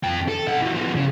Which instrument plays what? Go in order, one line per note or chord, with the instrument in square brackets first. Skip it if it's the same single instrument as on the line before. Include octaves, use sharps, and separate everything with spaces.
[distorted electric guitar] F2 G5
A4
B1 F#5
E3 F#3
F3 B3
C#3